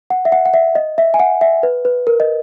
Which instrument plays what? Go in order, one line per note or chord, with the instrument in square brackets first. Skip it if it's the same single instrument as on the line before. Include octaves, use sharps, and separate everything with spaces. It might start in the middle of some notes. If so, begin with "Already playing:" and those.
[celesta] F#5
E5
F#5
F#5
E5
D#5
E5
G#5
F#5
E5
B4
B4
A#4
D#5